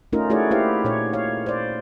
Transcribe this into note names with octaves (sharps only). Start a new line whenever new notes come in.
A3 C#4 D#4 F4 A#4
A3 E4 F#4 G#4 C#5 D5
A#3 E4 G4 C5 F5
A#2 D#4 C#5
C#5 F5
C5 D5